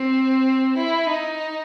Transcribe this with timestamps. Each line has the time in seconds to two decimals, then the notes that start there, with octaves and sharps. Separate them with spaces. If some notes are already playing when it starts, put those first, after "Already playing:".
Already playing: C4
0.78 E4
1.11 D#4